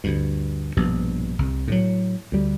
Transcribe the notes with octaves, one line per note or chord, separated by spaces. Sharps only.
D2 G2
A#1 G2 B2
C2
A2 C#3 F#3
D2 G3